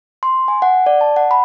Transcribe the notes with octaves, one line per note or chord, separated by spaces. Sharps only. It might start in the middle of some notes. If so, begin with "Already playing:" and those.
C6
G#5
F#5
D5
A5
F#5
B5